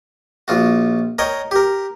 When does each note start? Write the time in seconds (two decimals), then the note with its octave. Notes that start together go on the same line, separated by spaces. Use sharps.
0.48 A#1 F4 F#4
1.19 A#4 C#5 D#5 G5
1.51 G4 A#4